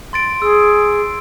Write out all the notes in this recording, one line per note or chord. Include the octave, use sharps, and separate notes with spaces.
C6 A6 D7
G#4 E6